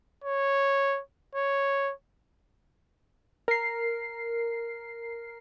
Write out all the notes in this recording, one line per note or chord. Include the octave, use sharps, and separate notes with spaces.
C#5
C#5
A#4 C7